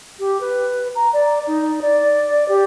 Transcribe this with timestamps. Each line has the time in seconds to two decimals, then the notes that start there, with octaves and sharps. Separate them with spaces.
0.19 G4
0.40 B4
0.95 A#5
1.13 D5
1.47 D#4
1.81 D5
2.48 G4